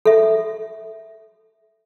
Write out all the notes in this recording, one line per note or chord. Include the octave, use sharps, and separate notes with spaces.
A4 E5